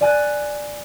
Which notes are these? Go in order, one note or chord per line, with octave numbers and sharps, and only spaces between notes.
D5 G#5 F#6 A6